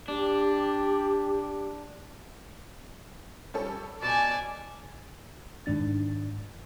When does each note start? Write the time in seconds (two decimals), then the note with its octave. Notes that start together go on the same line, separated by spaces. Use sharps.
0.08 D4 G4
3.54 G3 C#4 A4
4.02 B2 D5 G#5 A5
5.66 G#2 D#3 D4 A6